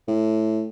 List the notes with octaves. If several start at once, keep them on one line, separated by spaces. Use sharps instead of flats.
A2